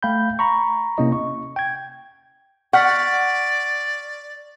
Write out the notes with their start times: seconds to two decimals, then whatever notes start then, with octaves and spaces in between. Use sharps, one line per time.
0.03 A3 F5 G5 B5 G6
0.39 A#5 B5 C#6
0.98 C3 A#3 C#4 E4 D#5
1.12 C#6
1.56 G5 G#6
2.73 D5 F#5 C#6 F6 B6